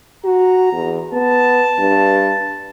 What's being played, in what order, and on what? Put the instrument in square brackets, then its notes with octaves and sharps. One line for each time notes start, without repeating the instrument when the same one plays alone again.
[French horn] F#4 [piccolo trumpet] A#5
[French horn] E2
[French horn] B3 [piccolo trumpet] A5
[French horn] G2